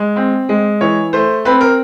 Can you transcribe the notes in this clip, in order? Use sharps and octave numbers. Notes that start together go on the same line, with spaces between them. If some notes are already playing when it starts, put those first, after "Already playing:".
Already playing: G#3
C4
G#3
E3 C#5
A3 C5
C4 B4
A#4